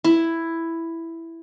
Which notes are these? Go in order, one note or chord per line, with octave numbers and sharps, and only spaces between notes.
E4